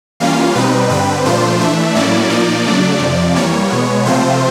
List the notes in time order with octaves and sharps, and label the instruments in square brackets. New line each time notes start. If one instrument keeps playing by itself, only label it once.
[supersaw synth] E3 G3 A#3 C#4 F4 F5
B2 G3 C4 D#4 B4
G2 D3 G3 C4 B4
A#2 F3 A3 D4 F4 C5
E3 A3 D4 E5
A2 F#3 A#3 C#4 E4 D5
A#2 F3 A#3 D#4 D5
C#3 F#3 A3 D4
F2 C3 F3
E3 G3 A#3 C#5
B2 G#3 B3
C3 F3 A3 C4 F4 C5